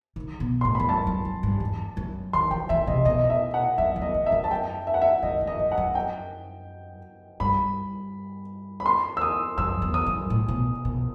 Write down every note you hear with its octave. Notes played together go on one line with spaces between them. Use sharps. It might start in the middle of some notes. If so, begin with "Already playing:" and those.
D#3
B2
A2 C6
E2 B5
F#2 A5
F#2
F#2
G2
E2
F#2
D#3 C6
E3 G5
E3 E5
C3 D#5
B2 D#5
D#5
E5
F#5
F#2 E5
E2
D#5
F#2
E5
F#2
A5
G5
E5
F#5
E5
F#2 D#5
F#2
D#5
F#2
F#5
F#2
G5
G2 B5
B5
C6
E6
D#6
F#2 E6
E2
D#6
F#2
A2
B2
B2